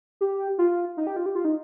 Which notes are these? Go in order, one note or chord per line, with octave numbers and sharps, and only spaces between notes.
G4
F4
D#4
G4
F4
G4
F4
D#4